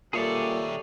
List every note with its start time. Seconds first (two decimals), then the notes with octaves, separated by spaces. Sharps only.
0.13 A#2 D#3 G3 G#4 A4 C#5 D5 E5